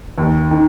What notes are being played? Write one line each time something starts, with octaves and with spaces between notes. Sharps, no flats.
D#2
D#3